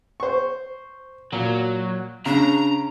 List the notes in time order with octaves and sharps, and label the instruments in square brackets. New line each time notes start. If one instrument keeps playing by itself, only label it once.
[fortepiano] C5 C#6
[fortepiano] A#2 [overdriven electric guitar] F#3
[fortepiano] C#3 [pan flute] D4 [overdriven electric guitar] A#5